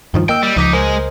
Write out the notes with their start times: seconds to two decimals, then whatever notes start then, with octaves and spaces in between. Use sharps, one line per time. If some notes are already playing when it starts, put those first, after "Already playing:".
0.14 G2 D#3 F3
0.29 A#3 D#5 G5 E6
0.43 G3
0.57 C#2 F3 D#4 D6 B6
0.73 G#3 A#4 C5 D#5